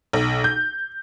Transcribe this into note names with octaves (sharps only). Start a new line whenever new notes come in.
B1
G6